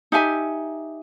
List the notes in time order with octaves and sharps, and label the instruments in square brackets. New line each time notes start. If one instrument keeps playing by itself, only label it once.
[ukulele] D#4 G4 E5 G#5